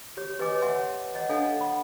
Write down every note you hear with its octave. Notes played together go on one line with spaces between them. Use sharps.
G4 C#5
G4 B4 C#5 D#5 G#5 D6
C#5 E5 F#5 G#5 C6
C#5 D#5 F#5
D4 A4 D#5 F5 F#5 G#5
F#5 B5